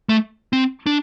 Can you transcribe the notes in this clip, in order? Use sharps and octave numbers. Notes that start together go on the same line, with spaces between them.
A3
C4
D4